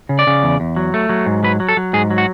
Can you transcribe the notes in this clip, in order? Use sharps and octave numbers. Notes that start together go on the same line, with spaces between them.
C#3
D5
C#3
E2
E2
F#3
A3
F#3
G#2
F#3 B4
F#3
A4
F#3
G#2 G#4
F#3
F#4